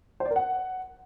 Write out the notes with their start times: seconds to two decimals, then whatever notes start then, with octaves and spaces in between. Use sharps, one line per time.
0.20 C5
0.25 D5
0.31 A#4
0.36 F#5